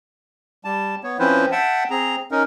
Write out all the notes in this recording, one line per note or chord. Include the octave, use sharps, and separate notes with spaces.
G3 A5
B3 C#5
F3 C4 C#4 E4 B4 C5
E5 F#5 G5 A5
C4 G#4 A#5
C#4 D#4 A#4